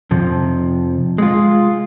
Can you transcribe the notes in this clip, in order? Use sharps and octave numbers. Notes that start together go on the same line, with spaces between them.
F2 C3 F3
G#3 F4